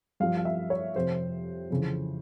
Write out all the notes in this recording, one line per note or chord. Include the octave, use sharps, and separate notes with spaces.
G2 F3 F5
F5
E5
C#5
F2 C3 F3 C5
F2 C#3 E3